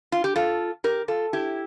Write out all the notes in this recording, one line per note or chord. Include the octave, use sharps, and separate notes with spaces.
F4
G4
F4 A4
G4 A#4
F4 A4
E4 G4